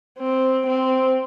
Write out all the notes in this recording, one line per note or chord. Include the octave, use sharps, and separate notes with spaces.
C4
C4